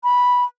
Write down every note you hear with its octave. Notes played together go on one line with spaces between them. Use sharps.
B5